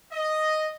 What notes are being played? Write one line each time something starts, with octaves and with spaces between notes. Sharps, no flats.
D#5